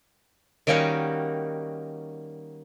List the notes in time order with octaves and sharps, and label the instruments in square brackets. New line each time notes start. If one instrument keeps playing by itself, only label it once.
[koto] D#3 G3 A#3 C#4 D#4 F#4